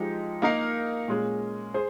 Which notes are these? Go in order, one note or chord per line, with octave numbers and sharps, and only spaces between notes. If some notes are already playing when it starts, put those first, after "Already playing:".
Already playing: F3 G#3 D#4 G4
A#3 D#4 A#4 F5
A#2 G#3 C#4 G#4
G#4 C5